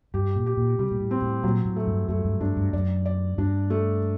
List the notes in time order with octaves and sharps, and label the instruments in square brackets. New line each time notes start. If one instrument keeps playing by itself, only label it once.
[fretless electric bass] G2 [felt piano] G4
[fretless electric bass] A#2
[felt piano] G4
[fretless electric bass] A#2
[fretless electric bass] C3 [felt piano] G3
[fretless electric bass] A#2
A2
[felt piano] C4
[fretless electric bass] A2
[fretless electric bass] A#2 [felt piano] F#3
[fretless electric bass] A2
[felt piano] A3
[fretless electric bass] G2
[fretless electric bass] F#2 [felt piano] A3
[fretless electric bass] G2
[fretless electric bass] G2 [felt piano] D4
[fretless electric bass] G2
[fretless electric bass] F#2 [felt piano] D5
[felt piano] D5
[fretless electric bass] G2 [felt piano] D4
[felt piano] A3